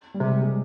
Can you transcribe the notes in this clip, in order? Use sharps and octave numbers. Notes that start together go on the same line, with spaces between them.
G3
C3 G#3
G#3